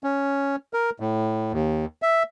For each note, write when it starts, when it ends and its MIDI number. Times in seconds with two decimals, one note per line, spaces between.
0.04 0.56 61
0.74 0.90 70
1.00 1.52 45
1.52 1.85 39
2.02 2.23 76